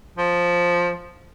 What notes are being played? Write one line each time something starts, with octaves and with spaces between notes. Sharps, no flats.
F3